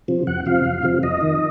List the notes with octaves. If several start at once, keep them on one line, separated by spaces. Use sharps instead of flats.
C3 F3
F2 F#5
C3 F3 F5
F2
C3 F3
F2 D#5
D#3